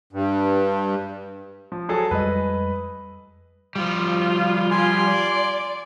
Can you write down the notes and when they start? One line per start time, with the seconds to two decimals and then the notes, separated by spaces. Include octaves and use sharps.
0.13 G2
1.72 F3
1.89 F#3 G#4 A4
2.11 F2 G3 G#3 B4 D#5
3.76 F3 G3 F4
4.71 F4 G4 G#4 G#5 C6
5.07 D5 D6